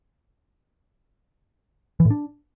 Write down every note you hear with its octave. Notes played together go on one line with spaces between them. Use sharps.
E3
A2
D4